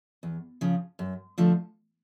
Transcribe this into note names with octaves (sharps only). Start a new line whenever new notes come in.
E2
C#3 F3
F#2
D3 F3 A3